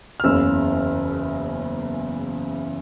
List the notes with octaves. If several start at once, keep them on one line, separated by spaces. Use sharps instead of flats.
F6
F#1 E2 C#3 E3 E6